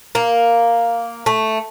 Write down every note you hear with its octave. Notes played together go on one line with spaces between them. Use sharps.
A#3
A3